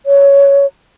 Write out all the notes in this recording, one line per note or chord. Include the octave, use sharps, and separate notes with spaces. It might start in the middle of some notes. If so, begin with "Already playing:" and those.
C#5